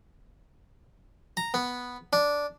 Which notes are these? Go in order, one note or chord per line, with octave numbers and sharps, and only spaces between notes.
A#5
B3
D4